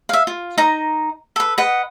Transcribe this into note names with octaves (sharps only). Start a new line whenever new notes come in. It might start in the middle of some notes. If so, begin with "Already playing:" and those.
E5 F5
F4
D#4 A#5
A4 B4
B4 D#5 F#5